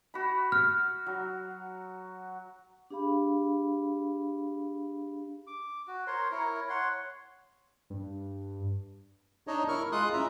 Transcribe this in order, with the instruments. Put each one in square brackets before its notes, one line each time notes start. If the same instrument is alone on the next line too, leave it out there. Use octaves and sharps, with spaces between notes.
[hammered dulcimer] F#4 B5
[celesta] F6
[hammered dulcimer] F#3
[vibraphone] D4 G4 G#4 F5 B5
[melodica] D6
F#4
A#4 C5 C#5 C6
E4 A#4 C#5
C#5 F#5 C6
[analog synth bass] G2
[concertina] D4 D#4 C#5 D#5
E4 A#4 C#6 F6
G#3 F4 C6 D#6 F#6
C#4 E4 E5 A#5